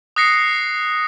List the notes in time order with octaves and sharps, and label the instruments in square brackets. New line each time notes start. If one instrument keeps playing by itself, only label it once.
[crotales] D#6 F#6 A#6 C7 C#7